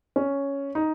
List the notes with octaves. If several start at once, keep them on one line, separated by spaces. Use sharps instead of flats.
C#4
D#4